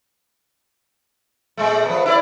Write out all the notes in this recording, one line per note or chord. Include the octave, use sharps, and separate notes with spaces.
A#2 G#3 A3
F3 B3
E4 F#4 D5